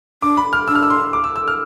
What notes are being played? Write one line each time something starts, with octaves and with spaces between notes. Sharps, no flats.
D4 D6
B5
F6
D4 E6
F6
E6
C6
D6
E6
E6
F6